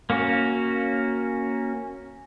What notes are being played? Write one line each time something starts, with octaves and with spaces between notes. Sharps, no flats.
A#3 C#4 F#4